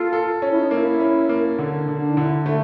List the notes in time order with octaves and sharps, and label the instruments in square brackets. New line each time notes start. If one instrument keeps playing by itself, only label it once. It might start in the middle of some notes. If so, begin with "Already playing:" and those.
Already playing: [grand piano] A#3 A4 [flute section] F4
[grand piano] A4
[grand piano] C#4 [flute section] F4
[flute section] E4
D#4
[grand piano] A#3 [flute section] E4
[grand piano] C#4
A#3
D3
[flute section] D4
[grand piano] D3
[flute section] D4
D#4
[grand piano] D3 [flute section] E4
[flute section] E4
[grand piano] A3